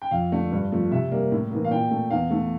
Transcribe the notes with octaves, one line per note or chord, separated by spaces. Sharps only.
G5
F2 F5
D3 A3
G2
F3 A3
C3 E5
G3 A#3
A2
E3 A#3
F5
A#2 G5
A3
E2 F5
E3 A3